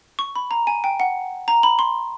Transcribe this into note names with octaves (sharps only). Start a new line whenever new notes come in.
C#6
B5
A#5
G#5
G5
F#5
A#5
B5
C6